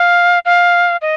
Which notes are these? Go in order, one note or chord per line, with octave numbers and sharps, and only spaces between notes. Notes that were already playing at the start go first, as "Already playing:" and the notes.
Already playing: F5
F5
D#5